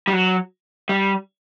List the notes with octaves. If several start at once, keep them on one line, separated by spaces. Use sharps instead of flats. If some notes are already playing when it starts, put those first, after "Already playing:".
G3
F#3
G3